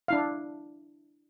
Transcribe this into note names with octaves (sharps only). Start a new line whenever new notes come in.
D4 E4 F5